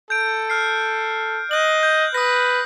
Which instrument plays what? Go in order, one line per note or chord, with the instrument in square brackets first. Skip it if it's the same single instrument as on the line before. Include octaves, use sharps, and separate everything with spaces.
[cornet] A4 [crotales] G6 D7
[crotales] F6 C7
[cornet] D#5 [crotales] F#6 F#7
[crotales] G6
[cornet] B4 [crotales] D#6 A#6